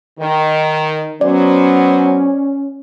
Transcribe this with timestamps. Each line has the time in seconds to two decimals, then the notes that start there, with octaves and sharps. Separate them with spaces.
0.19 D#3
1.21 F#3 B3 C#4 C5 D5